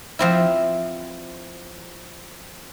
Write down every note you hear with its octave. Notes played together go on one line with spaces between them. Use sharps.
F3 C4 E4